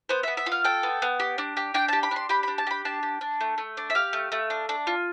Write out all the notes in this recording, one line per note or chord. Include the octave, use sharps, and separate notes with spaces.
B3 C5
B3 E5
E5
F4
F5
A4 G5
B3
B3
G4
D4
G4
D4 G5
G4 A5
B5
D4 C6
G4 B5
D4 B5
A5
G4 B5
D4 A5
G4
D4
A3
A3
D4
E5
G4 F5
A3
A3
D4
D4
F4